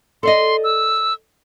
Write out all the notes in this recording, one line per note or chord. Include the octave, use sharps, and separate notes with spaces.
A4 D5 D#5 C6
E6